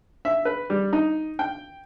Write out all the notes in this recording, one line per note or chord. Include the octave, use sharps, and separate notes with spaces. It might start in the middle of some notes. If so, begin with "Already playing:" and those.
E5
B4
G3
D#4
G5